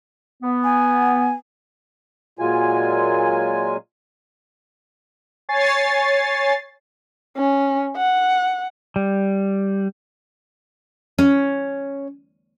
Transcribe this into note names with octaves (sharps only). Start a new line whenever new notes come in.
B3
G#5
A#2 F#3 G#3 F4 G#5
C#5 G#5 A6 C7
C#4
F#5
G3
C#4